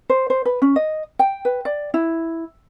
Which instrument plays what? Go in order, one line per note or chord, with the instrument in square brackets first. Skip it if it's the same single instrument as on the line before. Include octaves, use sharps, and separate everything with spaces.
[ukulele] C5
C5
B4
C#4
D#5
G5
B4
D5
E4